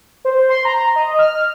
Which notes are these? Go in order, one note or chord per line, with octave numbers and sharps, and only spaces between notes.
C5
C6
A#5
D#5
F6